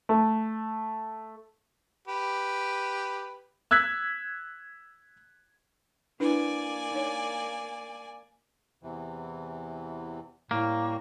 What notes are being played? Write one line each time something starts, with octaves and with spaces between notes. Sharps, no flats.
A3
G4 B4
E6 F#6 G#6 B6
A#3 D4 E4 B4 D5 G#5
D#4 C#5
E2 C3 E3
A2 G3 A#3 G5 C#6